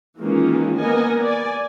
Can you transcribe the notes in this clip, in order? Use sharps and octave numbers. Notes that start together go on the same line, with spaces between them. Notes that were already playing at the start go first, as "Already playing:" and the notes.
D#3 E3 G#3 A#3 C#4 F4
A#3 B3 A#4 D#5 G#5
D5 G#5